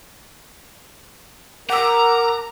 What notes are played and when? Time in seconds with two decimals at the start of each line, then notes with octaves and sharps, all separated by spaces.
1.70 A#4 F#5 A#5 D6 E6